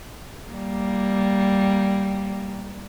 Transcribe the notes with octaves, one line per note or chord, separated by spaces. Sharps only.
G3 A#3